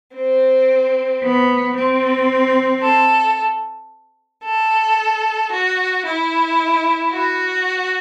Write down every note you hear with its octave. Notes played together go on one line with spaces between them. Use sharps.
C4
B3
C4
A4
A4
F#4
E4
F#4